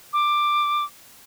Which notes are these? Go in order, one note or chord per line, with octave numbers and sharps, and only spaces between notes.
D6